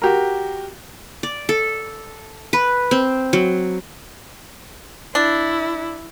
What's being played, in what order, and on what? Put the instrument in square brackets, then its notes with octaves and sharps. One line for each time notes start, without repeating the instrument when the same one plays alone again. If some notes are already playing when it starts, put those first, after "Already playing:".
[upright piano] F#4 G4 A#4
[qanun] D5
A4
B4
C4
F#3
[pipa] D4 [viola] E4